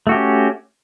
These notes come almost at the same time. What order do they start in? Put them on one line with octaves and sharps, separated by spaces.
A3 F#4 G4 C#4